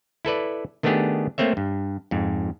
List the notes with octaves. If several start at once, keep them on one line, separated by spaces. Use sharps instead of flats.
E4 A4 B4 D5
D#3 A3 B3 D4 G4 G#4
A3 A#3 C4 C#5 E5
G2
F2 G#2